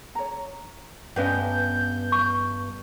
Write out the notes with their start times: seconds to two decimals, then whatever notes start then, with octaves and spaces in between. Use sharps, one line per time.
0.15 C#5 A#5
1.16 G2 B3 C#4 D#5 G5 G6
2.12 C#6